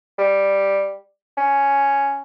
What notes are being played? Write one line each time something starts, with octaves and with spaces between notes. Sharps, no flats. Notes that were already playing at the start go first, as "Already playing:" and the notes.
G3
C#4